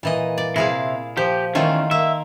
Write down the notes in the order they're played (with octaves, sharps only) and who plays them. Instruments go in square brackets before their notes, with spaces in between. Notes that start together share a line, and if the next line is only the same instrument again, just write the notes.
[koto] A#2 E3 D#5
D5
[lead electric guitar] C3 [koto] E4 G#4 F5
[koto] F3 [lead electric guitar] G4
[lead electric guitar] E2 C#4 [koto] D#3 A3 F4
[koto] A#3 [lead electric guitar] E5